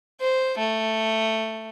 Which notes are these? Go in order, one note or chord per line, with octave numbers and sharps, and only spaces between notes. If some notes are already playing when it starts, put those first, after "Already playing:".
C5
A3